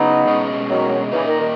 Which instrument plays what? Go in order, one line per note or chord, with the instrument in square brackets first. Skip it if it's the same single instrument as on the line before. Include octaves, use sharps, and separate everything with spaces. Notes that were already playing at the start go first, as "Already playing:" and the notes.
Already playing: [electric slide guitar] C#3 F#3 G#4 [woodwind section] B3 D#4
[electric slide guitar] B2 G#3 C#4
[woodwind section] D#3 F#3
[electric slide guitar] A#2 A#3 D#4 [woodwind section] C#3 E3
[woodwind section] D#3
D#3